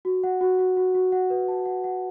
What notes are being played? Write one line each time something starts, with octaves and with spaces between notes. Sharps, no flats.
F#4
F#5
F#4
F#4
F#4
F#4
F#5
B4
A5
F#5
F#5